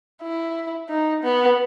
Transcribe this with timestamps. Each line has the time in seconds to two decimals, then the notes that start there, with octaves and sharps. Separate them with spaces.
0.22 E4
0.89 D#4
1.23 B3